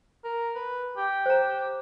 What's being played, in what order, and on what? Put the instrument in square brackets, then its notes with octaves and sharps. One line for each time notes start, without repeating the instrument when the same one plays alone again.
[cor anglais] A#4
B4
G4
[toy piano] C5 A#5